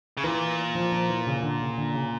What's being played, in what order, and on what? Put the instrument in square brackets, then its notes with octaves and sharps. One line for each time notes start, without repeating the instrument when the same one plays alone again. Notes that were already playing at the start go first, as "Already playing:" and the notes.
[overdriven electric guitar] C#3
[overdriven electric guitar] A#2 [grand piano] E3
[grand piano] F3
F3
E3
C#3
D3
C#3
D3
C#3